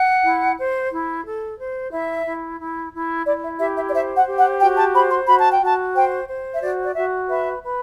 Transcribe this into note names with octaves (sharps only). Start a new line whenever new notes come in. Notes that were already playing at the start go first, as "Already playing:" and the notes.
Already playing: F#5
E4
C5
E4
A4
C5
E4 E5
E4
E4
E4
E4 D5
E5
G4 E5
E5
D5
C5 E5
F#5
G4
F#5
F#4 G5
A5
C5 B5
C6
F#4 B5
A5
G5
F#4 A5
C5 G5
C5
E5
F#4 D5
D5
F#4 E5
B4 E5
B4